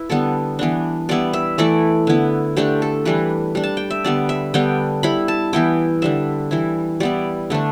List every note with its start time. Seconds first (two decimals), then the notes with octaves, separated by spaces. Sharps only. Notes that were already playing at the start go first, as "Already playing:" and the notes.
Already playing: E4 B4
0.10 D3 G3 B3 A4
0.59 E3 B3 D4
1.09 G3 B3 E4 D5
1.33 E5
1.58 E3 A3 E4 D5
2.07 D3 B3 E4
2.56 D3 A3 D4 G4
2.82 A4
3.05 E3 G3 D4 B4
3.55 G3 D4
3.63 A5
3.77 G5
3.90 E5
4.04 D3 G3 B3 D5
4.29 E5
4.54 D3 G3 B3 D4 G5
5.03 G3 E4 B5
5.28 A5
5.53 E3 B3 E4 G5
6.02 D3 G3 D4 E5
6.51 E3 G3 E4
7.00 G3 B3 E4 D5
7.50 D3 A3 D4